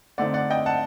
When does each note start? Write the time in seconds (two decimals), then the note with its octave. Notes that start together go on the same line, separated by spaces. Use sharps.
0.18 D3 A3 C4 D#4 D5 F#5
0.34 D5 F#5
0.50 D#5 G5
0.66 F#5 A5